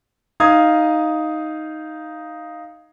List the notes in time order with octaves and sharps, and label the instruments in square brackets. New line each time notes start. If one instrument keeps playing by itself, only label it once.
[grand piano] D#4 F5 D#6 G#6